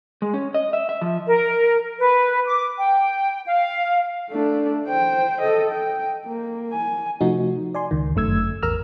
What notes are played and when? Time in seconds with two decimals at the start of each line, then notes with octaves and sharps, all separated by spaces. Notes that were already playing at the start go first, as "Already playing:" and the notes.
0.22 G#3
0.34 C#4
0.54 D#5
0.73 E5
0.89 E5
1.01 F3
1.27 A#4
1.99 B4
2.45 D6
2.78 G5
3.46 F5
4.31 A3 D4
4.87 C5 G5
5.41 A4 D#5
5.71 G5
6.25 A#3
6.73 G#5
7.21 C3 F3 A3 D#4 F#4
7.75 D5 G#5 C6
7.91 C#2 D#3
8.15 G1 F#2 A3 E6 G#6
8.63 A1 E2 A#4 A#5 E6 F6